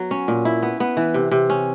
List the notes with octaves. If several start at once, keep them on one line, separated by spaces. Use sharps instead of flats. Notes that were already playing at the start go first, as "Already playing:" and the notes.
Already playing: F#3 B3
C#4
A#2
E4
B3
B3
E3
C3
C3
C#4